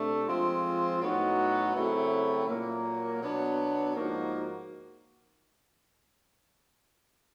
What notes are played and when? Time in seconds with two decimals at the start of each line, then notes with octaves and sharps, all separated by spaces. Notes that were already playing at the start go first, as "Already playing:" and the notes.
Already playing: C3 A3 D4
0.27 F3 G#3 C4 F4
1.00 A2 F#3 B3 D#4 F#4
1.74 C#3 F#3 A3 C4 E4
2.48 A#2 F#3 A#3
3.21 B2 F#3 B3 D4
3.95 G#2 F3 A#3 D#4 F#4